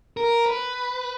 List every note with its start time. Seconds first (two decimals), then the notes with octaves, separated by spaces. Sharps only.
0.17 A#4
0.46 B4